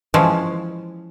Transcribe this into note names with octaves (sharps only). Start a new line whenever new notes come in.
E3 F3 G#3 C#4